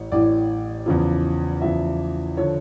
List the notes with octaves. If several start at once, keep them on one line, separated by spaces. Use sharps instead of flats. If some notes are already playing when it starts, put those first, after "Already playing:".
Already playing: A1 A2 C#5
A1 A2 E3 D5
E2 C#3 F3
E2 C#3 F3 E5
D3 F3 C#5